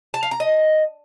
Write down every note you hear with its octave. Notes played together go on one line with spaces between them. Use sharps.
A5
F5
A#5
D#5